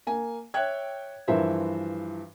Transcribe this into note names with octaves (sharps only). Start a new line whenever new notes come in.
A#3 G#5
C#5 E5 G5 F#6 G#6
G2 E3 F3 A#4 C5 E5